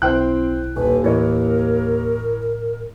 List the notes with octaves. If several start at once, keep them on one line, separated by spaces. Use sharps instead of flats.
B1 C4 E4 C5 G5 F#6
D#1 D#2 B4
A2 E3 A#4 C#5 D#5